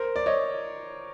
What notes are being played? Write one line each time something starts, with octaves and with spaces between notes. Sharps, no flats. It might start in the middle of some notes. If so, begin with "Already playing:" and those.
Already playing: A#4 C5
D5
C#5 D#5